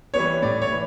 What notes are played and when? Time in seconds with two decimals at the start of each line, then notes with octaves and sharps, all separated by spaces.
0.14 E3 G3 B3 C#5
0.42 A2 D5
0.62 C#5
0.71 E3